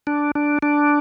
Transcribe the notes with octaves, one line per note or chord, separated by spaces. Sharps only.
D4
D4
D4